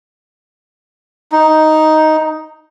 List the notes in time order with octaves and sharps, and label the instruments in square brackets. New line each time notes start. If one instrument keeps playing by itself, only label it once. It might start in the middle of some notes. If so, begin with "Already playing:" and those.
[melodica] D#4